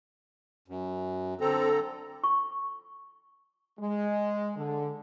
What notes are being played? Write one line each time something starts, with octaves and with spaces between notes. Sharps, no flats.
F#2
D3 C4 A4 A#5
C#6
G#3
D3